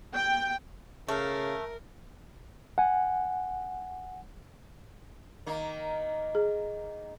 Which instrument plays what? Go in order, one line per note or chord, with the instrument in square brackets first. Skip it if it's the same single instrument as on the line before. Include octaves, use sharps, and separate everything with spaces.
[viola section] G5
[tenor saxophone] C#3 [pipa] A3 [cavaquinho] A4 F5 [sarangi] A#4
[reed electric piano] F#5 G#5
[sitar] D#3 A#3
[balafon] G#4